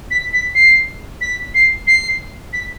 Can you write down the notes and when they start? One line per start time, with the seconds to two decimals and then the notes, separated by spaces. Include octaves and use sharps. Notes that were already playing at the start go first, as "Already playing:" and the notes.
0.11 B6
0.33 B6
0.55 C7
1.21 B6
1.55 C7
1.87 C7
2.53 B6